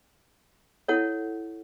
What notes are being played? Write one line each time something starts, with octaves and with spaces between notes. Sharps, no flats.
E4 A4 C#5 F#5